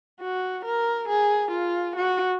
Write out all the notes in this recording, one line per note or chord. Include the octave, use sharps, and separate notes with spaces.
F#4
A#4
G#4
F4
F#4